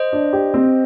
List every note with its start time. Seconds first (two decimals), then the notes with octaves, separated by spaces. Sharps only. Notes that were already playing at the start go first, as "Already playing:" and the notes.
Already playing: C5 D#5
0.13 D4
0.33 G4
0.54 C4